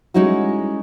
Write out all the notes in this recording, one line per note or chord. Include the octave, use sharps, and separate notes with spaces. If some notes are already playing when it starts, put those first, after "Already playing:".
G3 G#3 C#4 D#4 E4 F#4